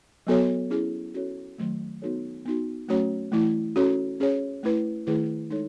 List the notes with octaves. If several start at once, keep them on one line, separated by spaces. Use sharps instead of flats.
F#3 B3 F#4 A4 C#5
C#4 E4 G#4
C#4 F#4 A4 C#5
D#3 F#3 A3
B3 D#4 F#4 A4 C#5
B3 D#4 F#4
F#3 A3 C#4 F#4 C#5
E3 A3 E4
C#4 F#4 A4 C#5
C#4 G#4 C#5
A3 E4 B4
D#3 A3 E4 G#4 B4
G#3 D#4 A4 C#5